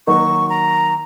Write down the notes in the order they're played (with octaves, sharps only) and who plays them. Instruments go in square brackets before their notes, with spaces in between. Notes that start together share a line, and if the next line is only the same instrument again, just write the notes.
[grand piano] D#3 F#3 A#3 D#4 F#4 [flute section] C#6
[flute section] A#5